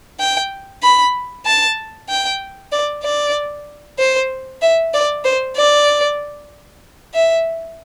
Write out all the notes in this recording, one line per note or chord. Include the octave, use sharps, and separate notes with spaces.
G5
B5
A5
G5
D5
D5
C5
E5
D5
C5
D5
E5